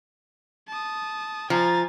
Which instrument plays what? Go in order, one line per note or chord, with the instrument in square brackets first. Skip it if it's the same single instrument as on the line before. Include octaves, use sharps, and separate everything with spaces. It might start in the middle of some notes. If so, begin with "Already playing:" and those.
[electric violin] A5 D#6
[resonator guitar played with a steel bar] F3 [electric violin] G#5 A6 [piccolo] A#5